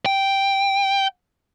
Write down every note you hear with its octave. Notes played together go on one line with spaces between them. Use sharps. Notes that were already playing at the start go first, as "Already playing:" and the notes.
G5